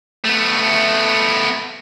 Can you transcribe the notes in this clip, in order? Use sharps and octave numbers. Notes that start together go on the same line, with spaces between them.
A3 B3